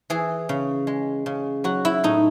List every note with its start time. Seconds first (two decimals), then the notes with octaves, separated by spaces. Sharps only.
0.10 E3 G#4
0.49 C#3
0.87 G#3
1.26 C#3
1.64 F#3 F#4
1.85 E4
2.04 A2 D#4